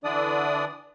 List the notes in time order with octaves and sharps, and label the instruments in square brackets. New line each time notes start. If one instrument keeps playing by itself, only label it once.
[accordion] D3 E3 D4 D5 D#6